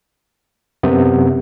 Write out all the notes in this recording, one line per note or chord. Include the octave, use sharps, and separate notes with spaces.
F#2 C3 B3